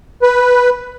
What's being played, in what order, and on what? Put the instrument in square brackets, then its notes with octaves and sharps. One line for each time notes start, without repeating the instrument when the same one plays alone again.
[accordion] B4